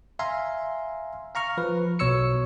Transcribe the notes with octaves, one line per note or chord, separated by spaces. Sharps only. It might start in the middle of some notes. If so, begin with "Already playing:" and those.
E5 F5 G#5 A#5 C6
F5 A#5 C#6 F6
F3 B4
B1 B2 C#5 C#6 E6 C#7